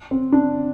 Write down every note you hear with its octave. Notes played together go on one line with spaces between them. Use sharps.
C4
D4